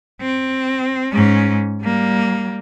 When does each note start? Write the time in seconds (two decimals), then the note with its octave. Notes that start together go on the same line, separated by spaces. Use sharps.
0.21 C4
1.13 G#2 C#4
1.81 G3 A#3